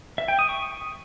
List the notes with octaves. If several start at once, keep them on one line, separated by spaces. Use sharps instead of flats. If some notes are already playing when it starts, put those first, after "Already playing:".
E5
G5
D#6
C#6